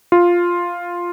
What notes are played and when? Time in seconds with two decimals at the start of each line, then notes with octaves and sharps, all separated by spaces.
0.12 F4